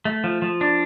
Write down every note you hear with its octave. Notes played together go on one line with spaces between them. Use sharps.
A3
F3
F3
D4